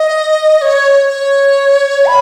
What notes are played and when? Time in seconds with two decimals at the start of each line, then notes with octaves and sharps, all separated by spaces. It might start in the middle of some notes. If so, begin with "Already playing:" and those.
Already playing: D#5
0.62 C#5
1.09 C#5
2.06 B5